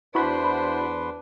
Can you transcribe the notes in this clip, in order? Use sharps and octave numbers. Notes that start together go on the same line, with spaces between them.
E2 D4 E4 F#4 B4 C5 B5 C6